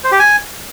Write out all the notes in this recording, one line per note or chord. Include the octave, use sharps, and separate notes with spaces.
C5
G4
G#5